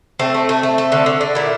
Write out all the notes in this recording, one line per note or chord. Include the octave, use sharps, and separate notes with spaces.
A3 C4
A3
A3
A3
A3
D3
D3
D3
A#2 E4